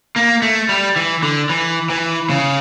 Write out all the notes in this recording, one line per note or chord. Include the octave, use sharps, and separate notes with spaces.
A#3
A3
G3
E3
D3
E3
E3
C#3